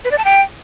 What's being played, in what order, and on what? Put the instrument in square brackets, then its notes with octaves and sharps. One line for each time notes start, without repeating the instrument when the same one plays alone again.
[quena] B4
D5
A5
G5